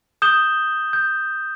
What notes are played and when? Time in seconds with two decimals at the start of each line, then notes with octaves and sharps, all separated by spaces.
0.22 D#6 G6 E7 G7
0.93 G6